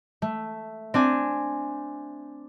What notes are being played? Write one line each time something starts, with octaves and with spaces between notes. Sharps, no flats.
A3
C4 D4 G#5